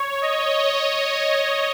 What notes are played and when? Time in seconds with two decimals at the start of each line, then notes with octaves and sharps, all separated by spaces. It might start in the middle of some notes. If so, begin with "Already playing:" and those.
Already playing: C#5
0.22 D#5